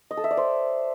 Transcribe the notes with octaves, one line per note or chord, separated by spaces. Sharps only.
D#5
A4
E5
D5
C5